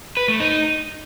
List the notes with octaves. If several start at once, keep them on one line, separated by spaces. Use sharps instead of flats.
B4
A3
D#4